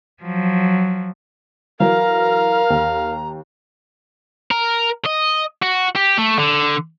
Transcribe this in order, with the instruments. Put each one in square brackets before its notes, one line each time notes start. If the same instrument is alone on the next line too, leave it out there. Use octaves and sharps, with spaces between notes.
[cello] F3 F#3
[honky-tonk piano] E3 F#3 [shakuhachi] A#4 [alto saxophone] F5 [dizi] A#5
[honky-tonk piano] D#2
[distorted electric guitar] A#4
D#5
F#4
G4
A3
D3